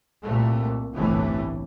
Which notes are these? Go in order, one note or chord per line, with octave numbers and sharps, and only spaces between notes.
C2 A#2 A3
G1 C2 A2 C3 E3 A3